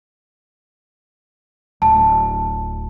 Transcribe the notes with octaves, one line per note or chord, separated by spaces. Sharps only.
D1 A5